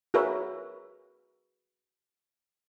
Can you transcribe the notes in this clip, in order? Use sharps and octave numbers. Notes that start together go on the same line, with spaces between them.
F#4 G#4 A#4 B4 C#5 E5